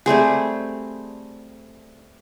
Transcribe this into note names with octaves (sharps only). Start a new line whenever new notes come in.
G3 A3 C4 G#4